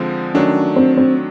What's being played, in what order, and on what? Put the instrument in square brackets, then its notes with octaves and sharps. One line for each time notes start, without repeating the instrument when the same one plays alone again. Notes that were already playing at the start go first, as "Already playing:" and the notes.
Already playing: [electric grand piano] D3 F3 G#3 C4
[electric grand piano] D#3 F#3 A3 D4 [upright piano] C#4
[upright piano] C4
C4